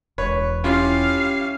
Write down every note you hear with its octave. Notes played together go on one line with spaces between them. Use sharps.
E1 B4 C#5
C#4 E4 F4 G4 F5